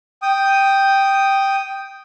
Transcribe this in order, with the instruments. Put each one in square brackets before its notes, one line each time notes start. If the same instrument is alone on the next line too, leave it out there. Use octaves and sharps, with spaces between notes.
[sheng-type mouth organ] G5 D#6